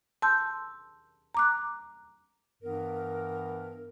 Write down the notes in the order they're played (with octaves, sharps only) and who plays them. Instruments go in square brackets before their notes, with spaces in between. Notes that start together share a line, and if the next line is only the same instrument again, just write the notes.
[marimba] A5 C6 E6 G6
A#5 D6 F#6
[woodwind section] G2 E3 B3 A#4